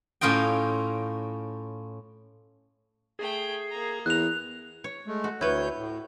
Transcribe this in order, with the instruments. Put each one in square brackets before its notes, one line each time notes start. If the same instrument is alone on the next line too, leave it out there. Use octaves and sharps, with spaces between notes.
[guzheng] A2 C#4 F4 D#5 G5
[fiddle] A3 G5 [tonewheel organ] G#4
[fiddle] A#3 A#5
[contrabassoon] E2 [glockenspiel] F#6 F7
[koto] C#5
[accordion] G#3 A3
[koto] F#4
[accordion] D2 C#5 G6 [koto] E4 B4
[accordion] A2